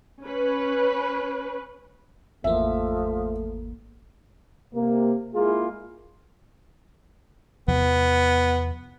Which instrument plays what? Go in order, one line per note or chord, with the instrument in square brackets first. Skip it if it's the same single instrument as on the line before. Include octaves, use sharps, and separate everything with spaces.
[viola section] C#4 B4
[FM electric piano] G#1 E2 A#3 [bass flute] F3 [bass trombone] A3 [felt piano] E5
[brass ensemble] C3 A#3
G#3 A#3 E4 F4 G#4
[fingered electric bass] E2 C3 F3 [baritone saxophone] B3